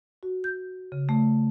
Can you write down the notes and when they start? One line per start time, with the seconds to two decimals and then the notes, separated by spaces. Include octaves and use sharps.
0.23 F#4
0.44 G6
0.92 C#3
1.09 A3